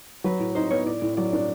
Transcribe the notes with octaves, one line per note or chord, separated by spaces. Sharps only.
F#3 B4
A2
D#4 C5
B3 C#5
A2 D5
A2
F#3 D5
D4